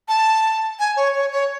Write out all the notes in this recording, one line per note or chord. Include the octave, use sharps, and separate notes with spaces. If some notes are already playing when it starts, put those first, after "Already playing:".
A5
G#5
C#5
C#5
C#5